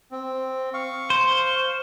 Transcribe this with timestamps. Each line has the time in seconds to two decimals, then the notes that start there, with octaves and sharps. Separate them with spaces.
0.11 C4
0.74 F5 C#6
1.10 C5